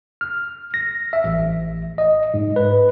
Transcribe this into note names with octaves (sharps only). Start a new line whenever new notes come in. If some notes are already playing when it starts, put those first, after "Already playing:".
F6
A#6
E5
A1
D#5
G#2
B4